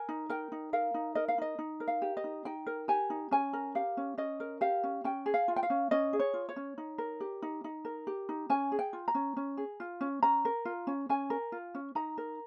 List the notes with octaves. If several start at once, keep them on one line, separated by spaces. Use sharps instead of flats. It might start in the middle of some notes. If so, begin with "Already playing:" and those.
Already playing: A#4 G#5
D#4
A#4 G5
D#4
A#4 F5
D#4
A#4 D#5
F5
D#4 D#5
D#4
A#4
F5
G4
D#5
D#4
D#4 G5
A#4
G4 G#5
D#4
C#4 G#5
A#4
G4 F5
C#4
C#4 D#5
A#4
G4 F5
C#4
C#4 G5
G#4
F5
F4
G5
F5
C#4
C#4 D#5
G#4
C#5
F4
C#5
C#4
D#4
A#4
G4
D#4
D#4
A#4
G4
D#4
C#4 G#5
G#4
G5
F4
A#5
C#4
C#4
G#4
F4
C#4
C#4 A#5
A#4
F4
C#4
C#4 G#5
A#4
F4
C#4
D#4 A#5
A#4